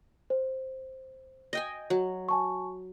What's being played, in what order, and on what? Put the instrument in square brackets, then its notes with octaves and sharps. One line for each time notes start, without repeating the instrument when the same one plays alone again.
[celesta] C5
[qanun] D#5 G5 G#5
F#3
[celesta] G#5 A5 C#6